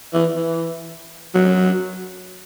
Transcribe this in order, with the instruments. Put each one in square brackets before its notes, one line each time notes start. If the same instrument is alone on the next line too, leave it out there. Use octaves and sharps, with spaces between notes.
[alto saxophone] E3
E3
F#3